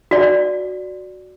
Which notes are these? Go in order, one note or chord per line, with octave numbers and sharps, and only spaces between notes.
F#4 D5